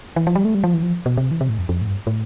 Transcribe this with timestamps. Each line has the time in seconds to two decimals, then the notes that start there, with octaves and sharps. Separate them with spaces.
0.16 E3
0.27 F3
0.35 G3
0.45 A3
0.55 G3
0.64 F3
0.74 E3
0.83 F3
1.06 B2
1.17 C3
1.31 E3
1.41 C3
1.49 A2
1.59 F2
1.69 F2
1.81 A2
1.87 G2
2.07 A2